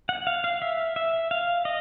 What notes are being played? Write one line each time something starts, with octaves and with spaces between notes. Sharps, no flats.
F#5
F5
F5
E5
E5
F5
D#5